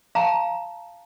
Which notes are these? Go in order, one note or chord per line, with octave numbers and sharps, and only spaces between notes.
F5 A5 A#5